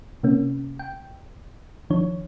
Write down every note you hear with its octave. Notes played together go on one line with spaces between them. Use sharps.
C3 A#3 C#4
G5
D#3 F3 D4 C#5